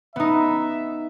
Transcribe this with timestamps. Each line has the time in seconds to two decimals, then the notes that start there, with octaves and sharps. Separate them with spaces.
0.16 B3 D#4 E5